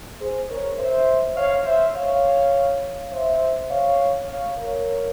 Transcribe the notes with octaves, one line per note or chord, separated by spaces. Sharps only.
G#4 C5
A#4 C#5
C5 E5
C#5 F5
C5 E5
C#5 F5
C5 E5
C#5 F5
C#5 F5
A#4 C#5